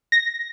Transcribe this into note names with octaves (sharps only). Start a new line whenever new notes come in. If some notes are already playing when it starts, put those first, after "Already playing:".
A#6